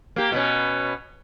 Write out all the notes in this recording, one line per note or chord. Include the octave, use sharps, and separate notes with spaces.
A#3 G4
B2 B3 C#4